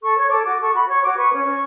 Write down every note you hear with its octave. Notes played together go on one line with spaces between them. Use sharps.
A4 C#6
C#5 C#6
A4 D6
F#4 D6
A4 C#6
F#4 B5
C#5 C#6
F#4 D6
B4 C#6
C#4
C#4